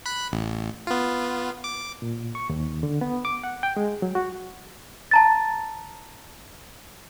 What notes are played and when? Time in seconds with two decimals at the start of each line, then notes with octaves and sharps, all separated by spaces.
0.06 B5 F#6
0.32 A1
0.87 B3 F4
1.64 D6
2.02 A#2
2.35 C#6
2.50 D#2
2.83 D3
3.01 B3
3.25 D6
3.43 F#5
3.63 G5
3.77 G#3
4.02 F#3
4.15 F#4
5.11 A5 A#5 A6